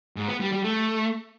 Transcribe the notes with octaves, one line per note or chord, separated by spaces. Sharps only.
G#2
B3
G3
G3
A3